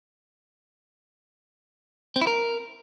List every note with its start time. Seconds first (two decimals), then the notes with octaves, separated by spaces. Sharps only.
2.16 C4
2.21 E4
2.27 A#4